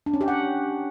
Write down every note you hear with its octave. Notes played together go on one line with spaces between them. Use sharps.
D4
C#4
G4
F#5